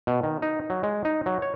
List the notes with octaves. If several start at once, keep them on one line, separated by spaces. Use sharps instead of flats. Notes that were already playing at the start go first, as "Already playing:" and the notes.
B2
D#3
D#4
F#3
G#3
D#4
F#3
C#5